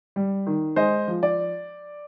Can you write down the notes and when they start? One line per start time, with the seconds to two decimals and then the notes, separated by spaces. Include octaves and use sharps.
0.16 G3
0.47 D#3
0.76 G#3 C5 D#5
1.08 F3
1.23 D5